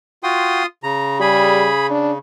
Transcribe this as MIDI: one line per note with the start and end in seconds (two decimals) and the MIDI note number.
0.23 0.66 65
0.23 0.63 66
0.23 0.63 79
0.23 0.66 84
0.23 0.66 87
0.83 2.18 49
0.83 1.18 82
1.20 1.69 55
1.20 1.87 68
1.20 1.87 83
1.90 2.12 62